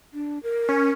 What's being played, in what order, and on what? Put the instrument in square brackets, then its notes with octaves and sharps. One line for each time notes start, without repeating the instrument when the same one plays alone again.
[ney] D4
A#4
[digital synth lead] C#4